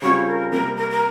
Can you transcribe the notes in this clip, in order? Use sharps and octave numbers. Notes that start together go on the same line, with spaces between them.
C#3 G3 C4 F4 C#5
A#4
C3 G3 A#3 A#4
A#4
A#4